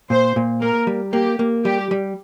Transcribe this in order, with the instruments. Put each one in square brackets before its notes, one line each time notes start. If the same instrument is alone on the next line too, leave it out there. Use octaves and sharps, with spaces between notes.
[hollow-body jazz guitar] A#2 [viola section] C5
[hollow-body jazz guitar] A#2
[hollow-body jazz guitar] A#3 [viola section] A#4
[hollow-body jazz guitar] G3
[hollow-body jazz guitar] A#3 [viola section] G4
[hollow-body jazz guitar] A#3
[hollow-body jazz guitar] G3 [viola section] G4
[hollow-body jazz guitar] G3